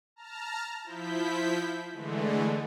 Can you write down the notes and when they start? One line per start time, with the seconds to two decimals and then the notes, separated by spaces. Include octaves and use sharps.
0.16 A5 A#5 F6
0.84 F3 E4 G6 B6
1.92 D3 E3 G#3 A3